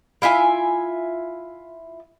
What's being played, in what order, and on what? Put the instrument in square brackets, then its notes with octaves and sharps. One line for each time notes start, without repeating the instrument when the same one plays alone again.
[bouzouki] E4 F4 E5 G#5